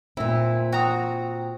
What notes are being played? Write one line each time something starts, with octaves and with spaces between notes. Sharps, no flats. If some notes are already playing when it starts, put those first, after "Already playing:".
A#2 C4 E4
F#4 G5 A#5 D#6